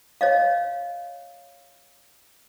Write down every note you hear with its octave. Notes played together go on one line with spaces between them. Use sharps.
C#5 D#5 F5